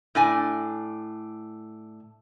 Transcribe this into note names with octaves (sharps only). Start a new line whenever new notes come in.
A2 D4 G#5